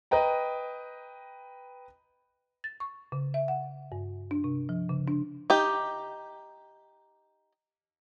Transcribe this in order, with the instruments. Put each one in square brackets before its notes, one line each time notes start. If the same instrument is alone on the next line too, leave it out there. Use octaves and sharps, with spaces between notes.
[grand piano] B4 D#5 G5 A#5
[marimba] A6
C#6
C#3
E5
F#5
G2
D4
C3
F3
C#3
D4
[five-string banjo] D#4 G4